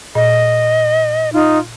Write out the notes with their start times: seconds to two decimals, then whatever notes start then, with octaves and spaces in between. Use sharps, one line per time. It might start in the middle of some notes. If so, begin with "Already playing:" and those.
0.15 A#2 D#5
1.33 D#4 F4